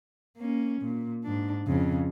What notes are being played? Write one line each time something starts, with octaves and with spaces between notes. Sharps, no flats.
A#3 C#4
A#2
G#2 D4
F2 C#3